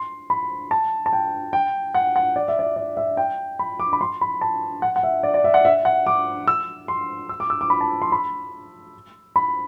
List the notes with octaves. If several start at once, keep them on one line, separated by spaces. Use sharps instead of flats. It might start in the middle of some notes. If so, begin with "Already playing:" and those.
Already playing: C6
B5
A5
A5
G5
G5
F#5
F#5
D5
E5
D5
D5
E5
G5
B5
D6
B5
C6
B5
A5
F#5
F#5
E5
D5
D5
E5
F#5
E5
F#5
D6
E6
C6
E6
D6
E6
D6
B5
A5
C6
B5
B5